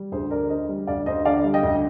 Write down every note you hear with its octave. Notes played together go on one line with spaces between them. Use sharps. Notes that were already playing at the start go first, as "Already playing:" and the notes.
Already playing: G3
D2 G#4 C5
D2 A#4 D5
D3 C5 D#5
G3
D2 D5 F5
D2 C5 D#5
D3 D5 F5
G3
D#5 G5
D2